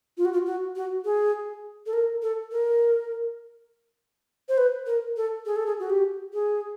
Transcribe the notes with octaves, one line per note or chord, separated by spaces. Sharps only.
F4
F#4
F4
F#4
F#4
G#4
A4
A#4
A4
A#4
C5
B4
A#4
A4
G#4
A4
G#4
F#4
G4
G#4